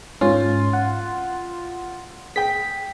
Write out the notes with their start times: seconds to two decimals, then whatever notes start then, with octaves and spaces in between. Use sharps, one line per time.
0.21 G#2 C#4 F4
0.73 F#5
2.36 G#4 G5 B6